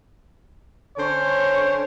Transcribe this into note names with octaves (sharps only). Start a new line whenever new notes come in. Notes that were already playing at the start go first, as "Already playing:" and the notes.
D3 C#4 C5 C#5